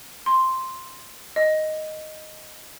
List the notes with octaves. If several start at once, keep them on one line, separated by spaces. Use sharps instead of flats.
C6
D#5